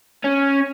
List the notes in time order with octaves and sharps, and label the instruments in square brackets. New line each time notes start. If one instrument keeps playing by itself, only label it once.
[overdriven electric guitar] C#4